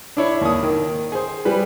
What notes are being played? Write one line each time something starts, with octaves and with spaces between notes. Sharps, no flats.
D4 E4 C#5
D#2 D#6
D#3
G#4 C5
G3 B4